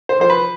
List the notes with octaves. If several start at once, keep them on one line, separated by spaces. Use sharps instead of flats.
C5
F3 C5
B4